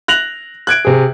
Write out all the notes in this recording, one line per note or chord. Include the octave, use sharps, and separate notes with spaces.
F#6 A#6 F7 F#7
F#6 G#6 D7
C3 G#4